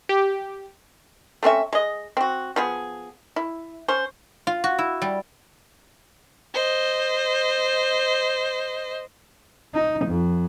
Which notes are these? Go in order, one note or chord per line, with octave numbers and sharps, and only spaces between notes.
G4
A3 C4 C#4 E5
G#3 D#5
C4 F#4
F3 B3 G#4
E4
C#4 C5
F4
F#4
E4
G3
C5 D#5
D#4
F2